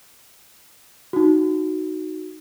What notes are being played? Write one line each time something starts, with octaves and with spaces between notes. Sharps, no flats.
D#4 F#4